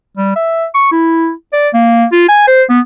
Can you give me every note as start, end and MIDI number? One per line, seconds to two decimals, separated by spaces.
0.17 0.35 55
0.36 0.66 76
0.75 0.87 85
0.92 1.32 64
1.53 1.69 74
1.74 2.05 58
2.12 2.24 65
2.29 2.45 80
2.48 2.63 72
2.70 2.80 59